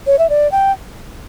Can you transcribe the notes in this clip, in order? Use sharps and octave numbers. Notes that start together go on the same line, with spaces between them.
C#5
E5
D5
G5